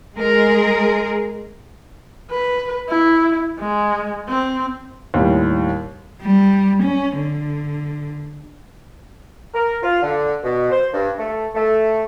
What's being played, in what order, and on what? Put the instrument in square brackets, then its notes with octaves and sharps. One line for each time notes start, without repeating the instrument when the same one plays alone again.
[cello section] G#3 G#4 A#4
[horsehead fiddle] B4
E4
G#3
C4
[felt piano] D#2 A2 G3
[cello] G3
C#4
D3
[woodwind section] A#4
F4
D3
B2
C5
G2
A3
A3